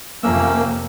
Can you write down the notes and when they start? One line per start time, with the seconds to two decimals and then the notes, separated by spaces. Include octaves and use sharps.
0.23 F2 C3 A3 A#3 C#4 E6